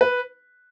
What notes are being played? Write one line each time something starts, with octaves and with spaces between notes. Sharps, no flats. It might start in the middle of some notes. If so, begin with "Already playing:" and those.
B4